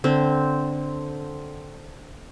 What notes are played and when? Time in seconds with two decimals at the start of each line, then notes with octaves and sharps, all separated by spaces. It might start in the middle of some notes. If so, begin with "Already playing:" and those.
0.04 D3 C4